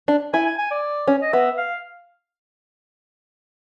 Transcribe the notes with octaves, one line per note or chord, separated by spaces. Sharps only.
D4
E4 G#5
G#5
G#5
D5
C#4
D#5
B3 E5
F5